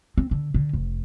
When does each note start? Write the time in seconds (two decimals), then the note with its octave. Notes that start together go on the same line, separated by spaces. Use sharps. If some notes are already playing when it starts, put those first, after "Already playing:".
0.18 C4
0.31 D3
0.54 D3
0.73 F1